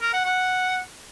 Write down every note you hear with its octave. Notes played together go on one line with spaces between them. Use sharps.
A#4
F#5
F#5